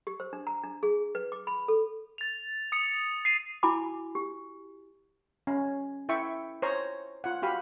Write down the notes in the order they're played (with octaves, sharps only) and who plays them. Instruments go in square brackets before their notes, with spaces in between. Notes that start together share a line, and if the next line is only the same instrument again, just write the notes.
[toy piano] G4
C5
D4
A#5
D4
G#4
B4
D6
B5
A4
[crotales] A6 F7
D#6 C#7
C7 D#7
[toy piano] E4 F#4 G#5 B5 D6
G4
[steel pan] C#4
E4 E5 G5 C#6
C5 C#5 A#5
F4 F#5
F#4 G4 F5 B5